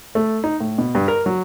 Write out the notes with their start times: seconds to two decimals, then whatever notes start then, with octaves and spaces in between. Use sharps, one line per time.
0.15 A3
0.44 D#4
0.60 A2
0.78 B2
0.95 G2
1.08 A#4
1.26 F#3